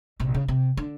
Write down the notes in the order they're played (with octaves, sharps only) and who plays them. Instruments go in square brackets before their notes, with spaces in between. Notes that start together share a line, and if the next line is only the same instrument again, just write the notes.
[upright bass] A#1 C3
C#3
C3
D3